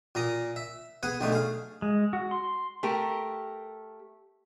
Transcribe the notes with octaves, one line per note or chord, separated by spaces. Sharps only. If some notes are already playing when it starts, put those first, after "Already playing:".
A#2 A#3 A#5 D#6
E5
B3 G#4 F#5 G#5
B1 F#2 D3 A3 D#4
G#4 F5
G#3
F#4
C6
A3 G4 A#4